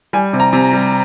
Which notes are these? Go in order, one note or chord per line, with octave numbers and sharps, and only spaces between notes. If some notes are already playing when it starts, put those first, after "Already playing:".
G3 G#5
C3
A#5
C3
G3